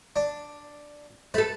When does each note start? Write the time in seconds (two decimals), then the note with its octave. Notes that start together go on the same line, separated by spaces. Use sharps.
0.16 D4
1.34 A3 A4 B4